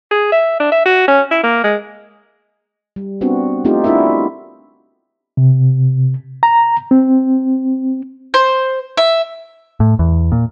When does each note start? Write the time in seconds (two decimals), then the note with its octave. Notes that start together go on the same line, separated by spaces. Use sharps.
0.11 G#4
0.32 E5
0.60 D4
0.72 E5
0.85 F#4
1.08 C#4
1.31 E4
1.43 A#3
1.64 G#3
2.96 G3
3.21 B3 C4 D4 F#4
3.65 A3 C4 D#4 F4 G4
3.84 D4 E4 F#4 A#4 E5
5.37 C3
6.43 A#5
6.91 C4
8.34 C5
8.97 E5
9.80 A2
9.99 E2
10.32 A#2